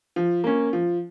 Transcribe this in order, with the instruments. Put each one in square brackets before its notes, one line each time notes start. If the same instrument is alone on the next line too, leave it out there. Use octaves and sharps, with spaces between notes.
[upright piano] F3
A#3 C#4
F3